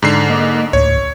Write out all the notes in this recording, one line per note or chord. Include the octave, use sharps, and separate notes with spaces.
G#2 D3 C7
A#3 D#5 D6
D2 A2 C#5